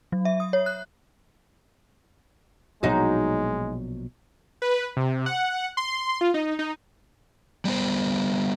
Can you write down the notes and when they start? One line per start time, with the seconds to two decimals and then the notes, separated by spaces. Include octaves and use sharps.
0.12 F#3
0.25 E5
0.40 D#6
0.53 C#5
0.66 F#6
2.83 A#1 B2 F#3 G#3 D#4 F#4
4.62 B4
4.97 C3
5.26 F#5
5.77 C6
6.21 F4
6.34 D#4
6.59 D#4
7.65 G3 B3 C5